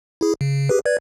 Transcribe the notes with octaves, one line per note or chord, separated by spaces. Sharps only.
E4 G#4
C#3
G4 G#4 B4
B4 D5 G#6